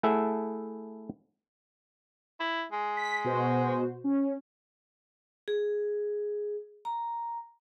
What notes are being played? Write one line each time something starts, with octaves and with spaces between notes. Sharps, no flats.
A3 E4 G#4 A4 E5 F#5
E4
G#3
B6
B2 F#4 C5
C#4
G#4
A#5